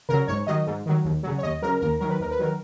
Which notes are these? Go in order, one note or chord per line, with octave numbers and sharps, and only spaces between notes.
C#3 F#3 A#4
G#2 C#5
D#3 F#3 D#5
G#2
D#3 F#3
D#2
C#3 F#3
C#5
D#2 D#5
C#3 F#3 A#4
D#2 A#4
D#3 F#3 A#4
B4
D#2 A#4
B4
D#3 F#3 A#4